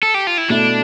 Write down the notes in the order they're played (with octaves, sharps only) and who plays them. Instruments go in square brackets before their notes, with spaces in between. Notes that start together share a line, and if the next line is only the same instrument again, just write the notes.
[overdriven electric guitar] A4
G4
F4
E4
[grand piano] B2 A3 E4 [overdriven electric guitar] D4